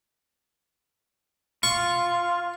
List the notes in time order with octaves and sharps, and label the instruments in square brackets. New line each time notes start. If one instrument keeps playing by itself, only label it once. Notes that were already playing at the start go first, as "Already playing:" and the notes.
[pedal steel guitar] F4 [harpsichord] C#6